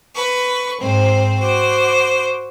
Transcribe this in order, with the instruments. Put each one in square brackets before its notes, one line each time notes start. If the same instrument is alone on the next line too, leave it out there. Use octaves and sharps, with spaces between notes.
[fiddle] B4 C#6
[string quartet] G#2 [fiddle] C4 C5
[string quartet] F#4 D6 [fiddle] C5